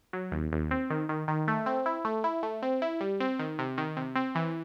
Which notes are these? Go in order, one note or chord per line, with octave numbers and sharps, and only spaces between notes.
F#3
D#2
D#2
C4
D#3
D#3
D#3
A3
C4
E4
A3
E4
A3
C4
E4
G3
C4
D#3
C3
D#3
C3
C4
E3